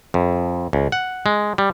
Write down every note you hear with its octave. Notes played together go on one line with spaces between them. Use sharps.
F2
C#2
F#5
G#3
G3